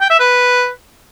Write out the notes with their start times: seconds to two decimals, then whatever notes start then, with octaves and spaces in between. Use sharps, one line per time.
0.01 G5
0.10 E5
0.20 B4